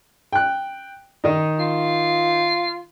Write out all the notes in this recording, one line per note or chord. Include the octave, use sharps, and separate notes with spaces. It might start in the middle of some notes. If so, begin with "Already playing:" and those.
G5 F#6
D#3 D#4
F4